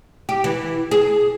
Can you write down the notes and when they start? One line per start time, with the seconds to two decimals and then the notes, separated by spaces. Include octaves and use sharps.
0.29 G4
0.44 E3
0.91 G#4